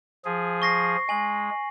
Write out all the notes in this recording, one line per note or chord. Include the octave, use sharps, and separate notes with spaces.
F3 G#4
C#6 A#6 C7
G#3 G#5 F#7